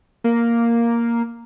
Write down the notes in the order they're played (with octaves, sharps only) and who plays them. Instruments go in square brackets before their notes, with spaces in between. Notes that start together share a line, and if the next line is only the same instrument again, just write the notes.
[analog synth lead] A#3